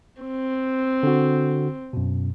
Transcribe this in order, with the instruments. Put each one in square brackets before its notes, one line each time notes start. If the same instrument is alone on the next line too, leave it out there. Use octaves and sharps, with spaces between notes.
[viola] C4
[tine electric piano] D3 F#4
F#2 B2